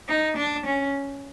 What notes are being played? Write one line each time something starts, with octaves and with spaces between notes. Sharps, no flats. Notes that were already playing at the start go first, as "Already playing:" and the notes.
D#4
D4
C#4